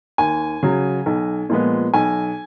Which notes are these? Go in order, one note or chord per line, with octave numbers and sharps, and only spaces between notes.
D#2 G#5
C#3 F#3
B1
A#2 F3 G#3 B3
B1 G#5